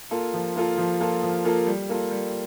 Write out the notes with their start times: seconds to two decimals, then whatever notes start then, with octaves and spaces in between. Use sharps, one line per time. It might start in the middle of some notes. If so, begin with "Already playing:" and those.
0.11 A#3 F4 A4
0.33 F3
0.56 A#3 F4 A4
0.77 F3
1.00 A#3 F4 A4
1.23 F3
1.45 A#3 F4 A4
1.66 G3
1.89 A#3 F4 A4
2.11 G3